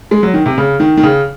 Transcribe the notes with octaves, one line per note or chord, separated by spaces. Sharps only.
G#3
F#3
D#3
C3
C#3
D#3
D#3
C#3